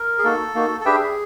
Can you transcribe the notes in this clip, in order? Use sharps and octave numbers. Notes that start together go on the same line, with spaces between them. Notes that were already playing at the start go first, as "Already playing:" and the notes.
Already playing: A#4
G#4
A#3 D#4 F#4 A4
A#3 D#4 F#4
A4
D4 G4 G#4 B4 E5 G5